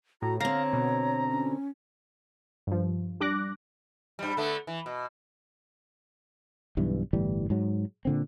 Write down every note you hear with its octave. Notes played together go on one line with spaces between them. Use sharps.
A2 F#4 A#5
D3 C4 C#5 F5 A#5 A#6
B2
C#4
G2 F3
G3 D4 D6 F#6 A#6
G2 G3
D3 A3 B3
E3
B2
B1 G2 E3
G1 A2 E3 G3
G#2 F#3
A#2 D3 C4